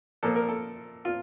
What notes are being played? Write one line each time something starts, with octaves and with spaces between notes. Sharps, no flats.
A#2 F3 A#3 A4
A#4
A4
F4